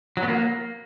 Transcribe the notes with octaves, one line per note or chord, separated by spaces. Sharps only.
F#3
B3
A#3